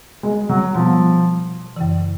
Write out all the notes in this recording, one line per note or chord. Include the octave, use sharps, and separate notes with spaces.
G#3
F#3
B2 F3 G3 B3
F#2 C#3 E3